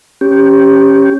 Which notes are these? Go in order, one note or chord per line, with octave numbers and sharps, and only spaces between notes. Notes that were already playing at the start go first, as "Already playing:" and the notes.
C#4 G4